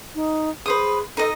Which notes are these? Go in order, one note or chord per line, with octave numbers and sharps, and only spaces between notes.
D#4
G#4 B4 C5 D#6
D#4 A4 D#5